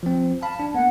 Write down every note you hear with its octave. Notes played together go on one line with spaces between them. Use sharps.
F3 C4
F5 A5 B5
D4
A#3 B3 F#5